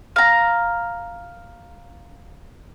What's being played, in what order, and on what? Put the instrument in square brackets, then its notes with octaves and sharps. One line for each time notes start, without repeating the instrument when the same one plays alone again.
[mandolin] F5 A#5